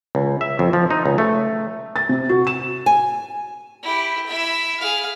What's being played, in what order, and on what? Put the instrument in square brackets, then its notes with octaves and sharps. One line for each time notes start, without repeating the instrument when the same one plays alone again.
[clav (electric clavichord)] C#2
E5
F2
F3
D#4
C#2
A3
[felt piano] A6
C3
F#4
E7
[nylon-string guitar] G#5
[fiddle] E4 G4
E4 E5
G#4 F5